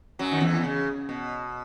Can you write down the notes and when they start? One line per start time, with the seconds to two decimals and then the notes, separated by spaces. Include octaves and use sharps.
0.19 F#2 F#3
0.31 D#3
0.41 E2 E3
0.64 C#3
1.09 B2